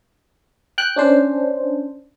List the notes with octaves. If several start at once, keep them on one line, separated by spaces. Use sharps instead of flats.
G5 F#6
C#4 D4 C5